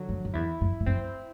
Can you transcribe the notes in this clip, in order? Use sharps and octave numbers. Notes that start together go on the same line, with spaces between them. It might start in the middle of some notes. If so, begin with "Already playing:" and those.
Already playing: D3 F#3
F#2
F#2
E2 E4
F#2
G2
F#2 C4